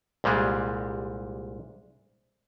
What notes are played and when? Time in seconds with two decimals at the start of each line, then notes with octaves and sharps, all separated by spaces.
0.24 C2 A#2 G3 G#3